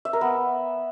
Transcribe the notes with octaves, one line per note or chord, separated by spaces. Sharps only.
E5
A#4
B3